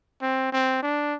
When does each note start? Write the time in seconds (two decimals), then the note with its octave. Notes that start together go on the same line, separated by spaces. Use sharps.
0.21 C4
0.52 C4
0.83 D4